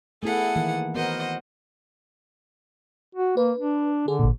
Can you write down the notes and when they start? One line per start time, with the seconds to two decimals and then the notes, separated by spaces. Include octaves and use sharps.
0.23 A3 B3 E4 G#4 A4 F#5
0.56 D#3 E3 A#3
0.95 B3 F#4 A#4 C5 D#5 F#5
3.15 F#4
3.37 A#3 B4
3.58 D4
4.08 D3 G#4
4.19 G#1 A#2